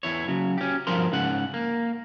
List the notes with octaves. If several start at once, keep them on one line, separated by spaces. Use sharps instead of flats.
E2 E4 C#5
C#3 F#3
C#4 G4
G2 B2 F3 A#4 A#5 C6
G#2 C#3 G#3 F#5
A#3